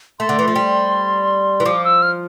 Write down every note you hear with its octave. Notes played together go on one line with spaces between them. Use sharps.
A3 C6
D3
E3
F3
G3
E3
F3 D6
E6
F6